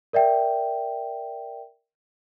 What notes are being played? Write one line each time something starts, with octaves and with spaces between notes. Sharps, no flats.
A#4 D5 E5 G5